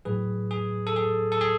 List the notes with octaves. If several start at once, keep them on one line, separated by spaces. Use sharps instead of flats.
A2 F#3 G#4 B4
G#4
A4
G#4
A4
G#4